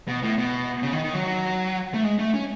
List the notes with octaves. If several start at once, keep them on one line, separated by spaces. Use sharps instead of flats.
B2
A2
B2
C#3
D#3
D#3
F#3
A3
G#3
A3
C#4